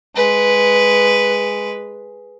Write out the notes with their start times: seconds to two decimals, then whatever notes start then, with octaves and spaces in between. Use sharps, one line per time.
0.16 G#3 B4